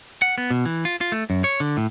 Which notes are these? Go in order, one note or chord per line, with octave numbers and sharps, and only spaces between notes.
F#5
B3
B2
E3
F4
F4
A3
F#2
C#5
D3
A2